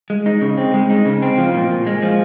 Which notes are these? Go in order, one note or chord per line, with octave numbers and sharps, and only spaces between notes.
G#3
D#4
C#3
C4
G#3
D#4
C#3
C4
F3
A#2
A#2
G#3
F3